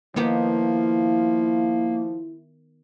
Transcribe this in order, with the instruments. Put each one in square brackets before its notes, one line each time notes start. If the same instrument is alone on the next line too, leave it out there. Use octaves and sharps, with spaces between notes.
[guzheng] D#3 B3 G4 [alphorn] F3 [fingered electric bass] A#3 [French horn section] E4